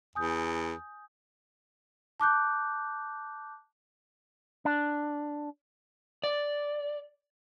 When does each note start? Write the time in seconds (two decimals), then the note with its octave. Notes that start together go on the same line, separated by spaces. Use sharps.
0.15 E2 G#5 D#6 G6
2.20 A5 D6 F#6 G6
4.65 D4
6.24 D5